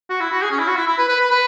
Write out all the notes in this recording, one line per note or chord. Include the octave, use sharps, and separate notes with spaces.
F#4
E4
F#4
G#4
C#4
E4
F#4
E4
E4
B4
B4
B4
B4